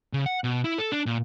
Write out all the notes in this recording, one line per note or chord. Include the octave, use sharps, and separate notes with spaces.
C#3
F#5
B2
E4
A4
D4
A#2